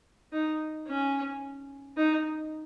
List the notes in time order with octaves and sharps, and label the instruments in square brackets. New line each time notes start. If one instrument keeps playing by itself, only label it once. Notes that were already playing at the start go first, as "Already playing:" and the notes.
[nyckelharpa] D#4
C#4
D#4